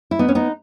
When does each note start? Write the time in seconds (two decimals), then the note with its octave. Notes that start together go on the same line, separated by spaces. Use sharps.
0.11 E4
0.19 B3 D#4
0.28 C#4
0.35 B3 D#4